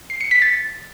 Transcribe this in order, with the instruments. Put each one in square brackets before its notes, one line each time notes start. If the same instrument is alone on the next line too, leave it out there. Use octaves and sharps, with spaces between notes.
[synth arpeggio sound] C7
C#7
B6
A6